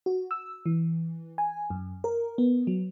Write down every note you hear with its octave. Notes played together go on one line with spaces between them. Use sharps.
F#4
E6
E3
G#5
F#2
A#4
B3
F#3